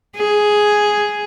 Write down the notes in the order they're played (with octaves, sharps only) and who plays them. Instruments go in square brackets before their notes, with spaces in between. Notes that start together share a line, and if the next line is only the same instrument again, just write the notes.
[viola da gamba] G#4